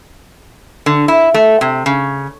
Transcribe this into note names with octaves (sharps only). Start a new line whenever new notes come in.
D3
E4
A3
C3
C#3